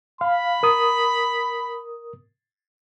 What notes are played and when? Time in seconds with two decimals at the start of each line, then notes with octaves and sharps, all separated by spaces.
0.21 F5 B5
0.63 A#4 D#6